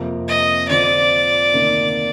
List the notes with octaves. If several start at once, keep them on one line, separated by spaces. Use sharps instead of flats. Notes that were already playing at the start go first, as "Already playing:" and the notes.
Already playing: F2 C3 F3 A#3
D#5
D3 F3 C4 F4 D5
D2 C3 D#3 A#3 D#4